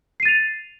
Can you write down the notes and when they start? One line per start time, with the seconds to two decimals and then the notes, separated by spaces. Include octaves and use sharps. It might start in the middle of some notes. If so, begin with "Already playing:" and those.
0.20 C7
0.23 D#7
0.25 A6
0.28 F7